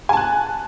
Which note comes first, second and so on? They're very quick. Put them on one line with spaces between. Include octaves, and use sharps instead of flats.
G#5 A5 F#6